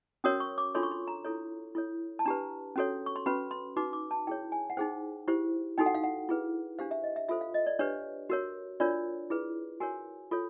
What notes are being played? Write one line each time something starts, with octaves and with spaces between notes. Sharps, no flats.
C#4 F#4 A#4 C#5 D#6
C#6
D6
D4 F4 A4 C#5 C6
C#6
C6
A#5
E4 A4 C#5
E4 A4 C#5
A5
D4 G4 B4 A#5
C#4 F#4 A4 C#5
C#6
C6
C#4 F#4 B4 B5
C6
D#4 F#4 B4 D6
D6
A5
E4 G#4 C#5 G5
G#5
F#5
D#4 G#4 C5 G5
E4 G4 C5
D#4 F#4 A4 G5
F#5
F5
F#5
E4 G#4 B4
D4 G4 C5 F5
E5
D#5
E5
F4 A4 C5 E5
F5
D#5
D5
D4 G4 B4 C#5
F#4 A#4 C#5
D4 F4 A#4 C#5 D5
E4 G#4 B4
F#4 A#4 C#5 G#5
F4 A4 C#5